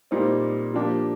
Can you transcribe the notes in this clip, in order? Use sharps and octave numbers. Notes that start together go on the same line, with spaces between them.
A#2 G3 C4 D#4
F3 A#3 D4 G4